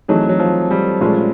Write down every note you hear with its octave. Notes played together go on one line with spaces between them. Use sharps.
E3 F#3 A3 C4 D#4 G#4
F#3
F3
G3
A#2 F3 G#3 A3 C#4